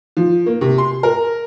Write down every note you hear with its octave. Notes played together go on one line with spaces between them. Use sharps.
F3
A#3
C3
C6
A#4